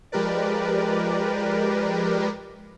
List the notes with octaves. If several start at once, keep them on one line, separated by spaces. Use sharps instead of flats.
F3 G#3 G4 A#4 B4 D5